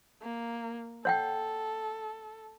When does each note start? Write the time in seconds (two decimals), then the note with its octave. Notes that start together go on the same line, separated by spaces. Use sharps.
0.22 A#3
1.05 A4 C#5 F#5 G5